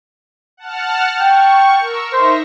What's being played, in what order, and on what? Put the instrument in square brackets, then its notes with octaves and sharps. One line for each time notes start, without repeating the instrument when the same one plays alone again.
[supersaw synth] F#5 A5 F6
[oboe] G5 [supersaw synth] C#6
[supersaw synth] A#4 E6
[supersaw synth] D#4 E5 A#6 [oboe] C5